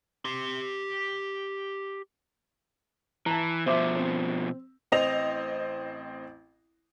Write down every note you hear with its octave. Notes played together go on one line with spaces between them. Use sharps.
G4 C6
E3 A5 A#5
B2 F3 C5 E5 D6
C4
A1 C4 D#5 A#6 F7